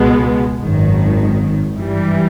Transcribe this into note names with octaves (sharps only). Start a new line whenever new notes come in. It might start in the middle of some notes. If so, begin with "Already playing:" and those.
Already playing: C#2 B2 G#3 B3
G#1 F#2 D#3
G2 E3 G3